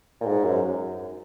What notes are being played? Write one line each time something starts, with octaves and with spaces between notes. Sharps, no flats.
A#2
G#2
F#2